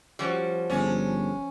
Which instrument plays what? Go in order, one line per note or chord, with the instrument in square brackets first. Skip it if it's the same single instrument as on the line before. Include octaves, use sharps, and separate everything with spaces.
[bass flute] F3 [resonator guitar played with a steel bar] G3 C#4 F#4
[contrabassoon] G1 [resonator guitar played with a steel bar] G3 G#3 [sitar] C#4